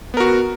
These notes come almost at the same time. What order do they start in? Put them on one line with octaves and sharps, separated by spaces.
B3 A#4 F#4